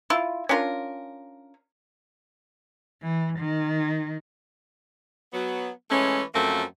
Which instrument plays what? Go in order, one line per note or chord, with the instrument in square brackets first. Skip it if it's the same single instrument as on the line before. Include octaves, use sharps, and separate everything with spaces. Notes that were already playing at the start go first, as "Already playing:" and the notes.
[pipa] E4 F4
C#4 D4 F4 A#4
[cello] E3
D#3
[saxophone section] F#3 B3
E3 G#3 A3 C#4
F#2 F3 A3 A#3 C4